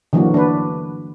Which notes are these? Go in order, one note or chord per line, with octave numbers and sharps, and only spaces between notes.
D3 E3 F#3 A#3 E4 F#4
D4 B4